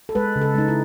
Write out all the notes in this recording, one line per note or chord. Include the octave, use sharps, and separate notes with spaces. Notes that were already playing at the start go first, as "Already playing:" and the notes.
A4
G#3 B4
C#3
A4
G#3 D#4
E4